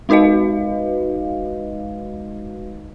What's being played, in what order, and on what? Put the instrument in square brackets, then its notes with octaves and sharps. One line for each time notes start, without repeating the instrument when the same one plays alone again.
[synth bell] G#3 D#4 F#4 B4 D#5 F5